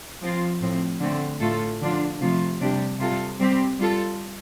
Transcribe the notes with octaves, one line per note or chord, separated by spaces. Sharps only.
F3 C4 F4
A2 F3 C4
D3 A3 C4
A2 A3 F4 A4
D3 F3 D4 F4
C3 F3 A3 F4
C3 G3 D4 G4
C3 G3 F4 A4
G3 C4 G4
G3 F4 A4